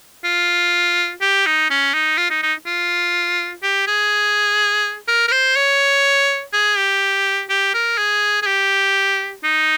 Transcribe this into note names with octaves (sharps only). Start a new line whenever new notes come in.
F4
G4
D#4
C#4
D#4
F4
D#4
D#4
F4
G4
G#4
A#4
A#4
C5
C#5
G#4
G4
G4
A#4
G#4
G#4
G4
D#4